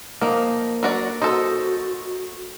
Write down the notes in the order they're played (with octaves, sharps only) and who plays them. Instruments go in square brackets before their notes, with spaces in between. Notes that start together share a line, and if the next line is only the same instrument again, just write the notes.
[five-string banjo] F3 D#4 [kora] A#3
[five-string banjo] F#3 F#4 D5
[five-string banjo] D#4 A4 [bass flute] F#4 [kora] C5